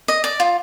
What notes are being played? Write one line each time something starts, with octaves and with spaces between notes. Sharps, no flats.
D#5
D5
F4